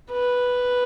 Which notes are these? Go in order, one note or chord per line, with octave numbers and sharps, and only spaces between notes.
B4